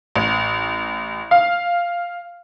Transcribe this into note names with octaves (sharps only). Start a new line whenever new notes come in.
A1
F5